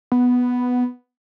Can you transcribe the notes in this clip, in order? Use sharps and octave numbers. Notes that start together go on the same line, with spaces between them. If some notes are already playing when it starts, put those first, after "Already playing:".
B3